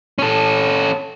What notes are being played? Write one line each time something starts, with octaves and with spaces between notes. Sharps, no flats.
C#4 A4